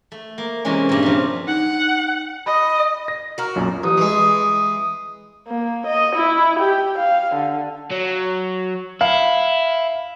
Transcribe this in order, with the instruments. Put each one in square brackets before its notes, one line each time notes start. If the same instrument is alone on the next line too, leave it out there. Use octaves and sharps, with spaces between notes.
[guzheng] A3
A#3
C3 E3 G#3 A#3 C#4
G2 A#2
C3 F3
[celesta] D#4 [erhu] F#5
[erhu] D#5 [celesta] B5
[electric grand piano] A#6
[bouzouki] F#4 A#4
[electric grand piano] B1 F#2 A#2
[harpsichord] A1 [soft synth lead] D#6
[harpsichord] E3 G#3
[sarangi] A#3
D#5
E4
G4
F5
D3
[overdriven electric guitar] F#3
[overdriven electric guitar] E4 [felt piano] F5